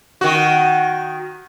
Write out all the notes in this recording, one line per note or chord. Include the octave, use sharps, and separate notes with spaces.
D#3 F#4